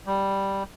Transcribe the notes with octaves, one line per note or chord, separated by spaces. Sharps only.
G3